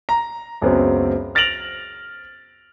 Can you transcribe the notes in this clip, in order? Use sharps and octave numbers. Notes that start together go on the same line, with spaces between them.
A#5
C#2 F#2 F#3 B3 C4
F6 A6 A#6 D7 F7 F#7